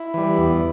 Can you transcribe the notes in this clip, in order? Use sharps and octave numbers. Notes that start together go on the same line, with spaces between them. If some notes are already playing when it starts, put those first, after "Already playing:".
Already playing: E4
E3 G3
E2